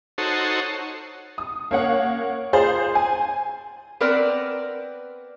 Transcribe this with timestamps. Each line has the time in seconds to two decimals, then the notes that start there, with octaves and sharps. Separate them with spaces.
0.18 D#4 F#4 A4 C5 C#5
1.38 D#6
1.71 A#3 C#4 C#5 F#5
2.53 F4 G#4 C5 A6
2.95 G#5
4.01 B3 C4 A#4 B4 D5